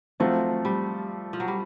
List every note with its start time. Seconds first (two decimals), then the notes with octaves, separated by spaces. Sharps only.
0.20 F3 F#3 A3 C4 F4
0.65 G3
1.33 F3
1.40 F#3
1.48 G3